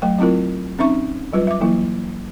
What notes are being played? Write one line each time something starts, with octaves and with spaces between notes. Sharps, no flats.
F#3 A3 G5
F#3 C4 E4 F4 A#4
C4 C#4 D#4 E5 C#6
F#3 G3 F4 B4
E5 D6
E3 F#3 A#3 E4